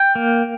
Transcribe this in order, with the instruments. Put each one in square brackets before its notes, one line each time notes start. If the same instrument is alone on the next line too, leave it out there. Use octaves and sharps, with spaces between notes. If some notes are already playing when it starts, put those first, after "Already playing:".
Already playing: [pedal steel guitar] G5
A#3